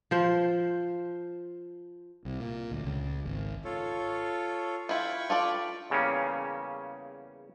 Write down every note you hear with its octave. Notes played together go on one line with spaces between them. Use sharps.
F3 C5
C2
A#2
D2
C#2
G#1
F4 A4 C#5
E4 F4 G5 B5 C#6
F4 A4 D5
E2 C#3 G3 A#3 C#4